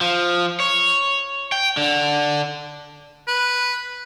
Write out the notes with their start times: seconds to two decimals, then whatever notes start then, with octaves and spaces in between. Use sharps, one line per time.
0.01 F3
0.60 C#5
1.52 G5
1.77 D3
3.28 B4